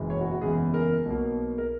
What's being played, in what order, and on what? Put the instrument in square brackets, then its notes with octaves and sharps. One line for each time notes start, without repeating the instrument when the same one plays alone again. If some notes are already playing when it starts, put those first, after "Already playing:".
Already playing: [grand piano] F#1 E2 B2 G#3
C#5
F#4
F#4
F#1 E2 C#3 G#3 G#4
A#4
B1 B2 A#3
A#4